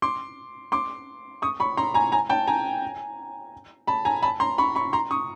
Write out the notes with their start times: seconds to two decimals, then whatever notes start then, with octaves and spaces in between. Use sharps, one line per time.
0.02 C6 D6
0.72 C6 D6
1.42 C#6 D#6
1.60 B5 C#6
1.77 A#5 C6
1.94 G#5 A#5
2.12 G#5 A#5
2.29 G5 A5
2.47 G#5 A#5
3.87 A5 B5
4.05 G#5 A#5
4.22 A5 B5
4.40 A#5 C6
4.58 B5 C#6
4.75 B5 C#6
4.93 A#5 C6
5.11 C#6 D#6